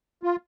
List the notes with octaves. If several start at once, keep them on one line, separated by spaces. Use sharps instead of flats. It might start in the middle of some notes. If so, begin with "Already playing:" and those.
F4